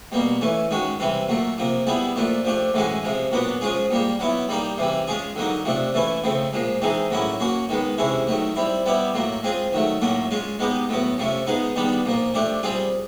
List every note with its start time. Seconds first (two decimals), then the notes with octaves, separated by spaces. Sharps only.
0.12 B2 G3 A#3
0.41 E3 A3 C#4
0.71 D#3 G#3 C#4 F#4
0.99 C3 E3 G3 C4
1.29 A#2 F#3 A3
1.58 C3 F3 A#3
1.87 G3 B3 E4 G#4
2.16 A#2 F3 A3 D4
2.45 F3 A3 D4 G4
2.74 A2 E3 G#3 C#4 F#4
3.03 C3 F3 G#3
3.32 A#2 F#3 B3 D4
3.61 F3 G#3 C#4 F4 G#4
3.91 A#2 G3 A#3
4.19 F#3 B3 E4
4.49 G3 A#3 D#4 G4
4.77 C3 E3 G3
5.07 G#3 C#4 F4 G#4
5.36 D3 F#3 A#3 D#4
5.65 C3 F3 A3 D4
5.94 E3 A3 C#4 E4
6.24 C#3 F3 A3 C4
6.53 A#2 F3 G#3
6.82 E3 G#3 C4 D#4 G#4
7.11 A2 F#3 A#3 C#4 E4
7.40 F#3 A#3 C#4 F#4
7.69 D#3 G#3 B3
7.98 C3 E3 G#3 C#4 E4
8.27 D#3 F#3 A3
8.55 G3 C4 E4
8.86 G3 B3 E4 G4
9.14 A2 F#3 A#3
9.43 G#3 C4 F4 G#4
9.73 D#3 F#3 A3
10.01 A2 F#3 A#3 C#4
10.31 G#3 C#4 F4
10.59 G#3 B3 D#4 G4
10.89 A2 F#3 B3
11.18 C3 F3 A3 C#4
11.47 G#3 B3 D#4 G#4
11.76 D#3 G3 B3 D4
12.05 A#2 F3 A#3
12.34 F3 A3 D4 G4
12.63 G3 C4 F4 G#4